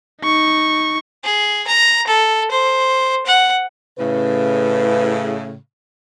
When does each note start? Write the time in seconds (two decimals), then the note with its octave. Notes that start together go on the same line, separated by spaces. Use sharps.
0.22 D#4 C#6
1.24 G#4
1.67 A#5
2.07 A4
2.51 C5
3.26 F#5
3.99 A2 C#3 B4